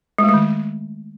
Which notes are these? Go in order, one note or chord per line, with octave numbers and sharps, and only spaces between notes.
G#3
A3
G#3
D#3